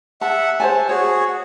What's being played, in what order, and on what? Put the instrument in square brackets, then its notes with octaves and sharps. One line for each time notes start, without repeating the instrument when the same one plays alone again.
[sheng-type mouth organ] E5 F#5 [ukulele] A5
[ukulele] C5 C#5 G#5 [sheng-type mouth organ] A5
[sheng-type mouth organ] F#4 G#4 [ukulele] C#5